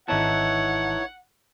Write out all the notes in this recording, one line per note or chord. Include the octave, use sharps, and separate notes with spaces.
G#1 E3 D#4 E4 C#5 F#5 A5